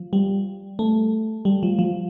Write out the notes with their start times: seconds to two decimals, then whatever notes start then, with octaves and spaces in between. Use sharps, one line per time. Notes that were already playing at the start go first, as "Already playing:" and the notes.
Already playing: F3
0.13 G3
0.79 A3
1.45 G3
1.63 F3
1.79 F3